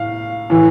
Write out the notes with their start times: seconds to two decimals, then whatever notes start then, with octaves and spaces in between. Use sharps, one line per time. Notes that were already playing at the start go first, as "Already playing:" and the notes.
Already playing: A2 F5
0.50 A2 E3